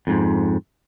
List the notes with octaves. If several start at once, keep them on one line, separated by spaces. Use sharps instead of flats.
F2 G#2